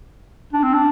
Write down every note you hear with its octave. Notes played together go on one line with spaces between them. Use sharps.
D4
C4
D4